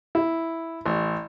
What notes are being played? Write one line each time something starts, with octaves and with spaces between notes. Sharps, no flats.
E4
A1